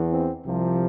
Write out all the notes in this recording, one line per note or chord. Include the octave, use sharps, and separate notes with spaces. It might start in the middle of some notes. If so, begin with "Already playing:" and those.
Already playing: E2 E3
C4
C2 C3 F3